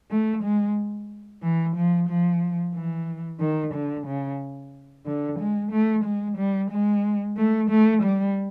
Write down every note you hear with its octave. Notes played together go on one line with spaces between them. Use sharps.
A3
G#3
E3
F3
F3
E3
D#3
D3
C#3
D3
G#3
A3
G#3
G3
G#3
A3
A3
G3